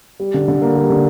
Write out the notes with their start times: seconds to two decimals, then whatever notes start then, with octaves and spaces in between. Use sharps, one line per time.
0.20 G3
0.34 D3
0.48 D3
0.62 A#3
0.76 G3
0.90 D3